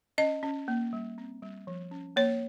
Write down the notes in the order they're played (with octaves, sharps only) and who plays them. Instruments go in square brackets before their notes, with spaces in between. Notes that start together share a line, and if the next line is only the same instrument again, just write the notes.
[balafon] C#4 D#5
C#4
A#3
G3
C4
G3
F3
C#4
A#3 C#5